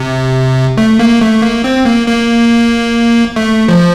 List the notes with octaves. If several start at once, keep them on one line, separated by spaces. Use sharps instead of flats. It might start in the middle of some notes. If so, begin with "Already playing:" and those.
Already playing: C3
A3
A#3
A3
A#3
C4
A#3
A#3
A3
F3